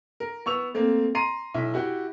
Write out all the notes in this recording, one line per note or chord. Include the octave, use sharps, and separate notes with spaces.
A#4
B3 C#6 E6 F7
A3 A#3 C4
A#5 C6 C7 D#7
B1 E4 E5
E4 F#4 G4 G5